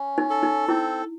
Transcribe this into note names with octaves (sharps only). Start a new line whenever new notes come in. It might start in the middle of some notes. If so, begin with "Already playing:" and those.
Already playing: C#4
D#4
A4
D#4
C4 E4